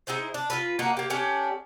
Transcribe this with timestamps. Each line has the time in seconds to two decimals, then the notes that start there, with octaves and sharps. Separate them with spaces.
0.07 D#4 E4 G#4 C5
0.34 D4
0.50 F4 A4 B4
0.79 A#3 D4 D#4 F#4
0.97 A#3 G4
1.10 A3 C#4 D4 G4